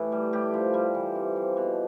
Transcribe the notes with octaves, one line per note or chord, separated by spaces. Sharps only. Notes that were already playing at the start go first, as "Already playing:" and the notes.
Already playing: A2 E3 G4
G3
A2 G4
F3
G3
E3
C3
F3
B2